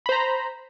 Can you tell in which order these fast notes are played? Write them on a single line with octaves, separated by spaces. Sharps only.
B5 C5 A#5